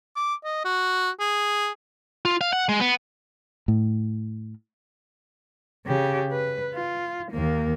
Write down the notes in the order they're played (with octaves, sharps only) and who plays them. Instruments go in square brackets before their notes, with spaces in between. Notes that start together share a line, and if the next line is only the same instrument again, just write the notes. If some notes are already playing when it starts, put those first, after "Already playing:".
[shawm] D6
D#5
F#4
G#4
[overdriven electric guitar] F4
F5
F#5
G#3
B3
[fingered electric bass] A2
[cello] C#3 G4
B4
F4
D#2 A#3